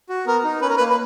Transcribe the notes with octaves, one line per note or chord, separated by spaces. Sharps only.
F#4
B3 A#4
D#4
C#4 B4
A#4
A#3 B4
B4